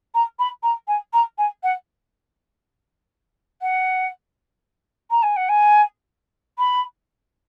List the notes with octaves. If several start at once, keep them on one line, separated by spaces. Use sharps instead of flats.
A#5
B5
A#5
G#5
A#5
G#5
F#5
F#5
A#5
G#5
F#5
G#5
B5